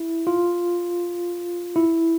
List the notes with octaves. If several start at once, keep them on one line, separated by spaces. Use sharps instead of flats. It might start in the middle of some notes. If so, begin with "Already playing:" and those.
Already playing: E4
F4
E4